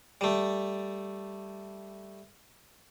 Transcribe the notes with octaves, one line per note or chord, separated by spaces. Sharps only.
G3 A3